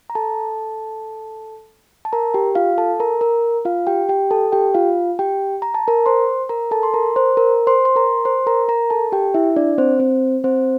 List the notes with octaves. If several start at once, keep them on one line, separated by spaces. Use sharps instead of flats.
A#5
A4 A5
A5
A#4 A#5
G4 G5
F4 F5
A4 A5
A#4 A#5
A#4 A#5
F4 F5
G4 G5
G4 G5
A4 A5
G4 G5
F4 F5
G4 G5
A#5
A5
A#4 A#5
C5 C6
A#4 A#5
A4 A5
C6
A#4 A#5
C5 C6
A#4 A#5
C5 C6
C6
A#4 A#5
C5 C6
A#4 A#5
A#4 A#5
A4 A5
G4 G5
E4 E5
D4 D5
C4 C5
C4 C5
C4 C5